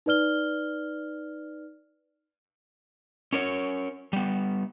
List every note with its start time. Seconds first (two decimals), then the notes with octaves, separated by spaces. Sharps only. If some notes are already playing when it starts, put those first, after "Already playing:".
0.06 D#4 B4 D5 F6 G7
3.33 C#4 A#4 C#5
4.13 G3 B3